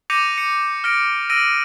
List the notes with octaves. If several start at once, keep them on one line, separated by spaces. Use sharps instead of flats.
D6 G6 A#6 C#7 D#7 F7
C#7
F6 A#6 D7
E6 A#6 D7 D#7